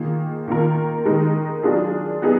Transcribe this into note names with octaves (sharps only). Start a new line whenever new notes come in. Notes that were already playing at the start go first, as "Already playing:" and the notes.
Already playing: D#3 A#3 F4 G#4
D#3 A#3 F4 A#4
D#3 G#3 D#4 A#4
F#3 D4 F4 G#4
F#3 B3 D#4 G#4